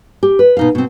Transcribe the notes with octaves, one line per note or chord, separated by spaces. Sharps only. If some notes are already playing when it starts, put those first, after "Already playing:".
G4
B4
B2 D#4 F5
B2 C4